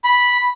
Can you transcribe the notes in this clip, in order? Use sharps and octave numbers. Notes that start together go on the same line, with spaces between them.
B5